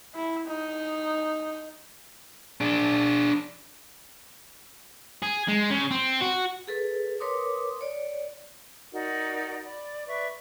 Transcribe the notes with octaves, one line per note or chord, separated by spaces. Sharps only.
E4
D#4
D4 G#4
G#4
G#3
C#3
C4
F#4
G#4 A4 B4
A#4 B4 C#5 C6 D6 D#6
C#5 D5
D#4 F#4 A#4 D5
D5 B5
B4 D5 E5 C#6